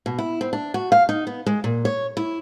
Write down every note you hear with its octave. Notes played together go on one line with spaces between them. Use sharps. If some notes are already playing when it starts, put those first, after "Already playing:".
B2
E4
C4
D4
F#4
F5
D#4
B3
G#3
A#2
C#5
E4